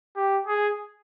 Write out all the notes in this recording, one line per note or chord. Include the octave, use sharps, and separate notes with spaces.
G4
G#4